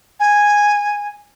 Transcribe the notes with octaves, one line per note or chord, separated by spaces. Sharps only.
G#5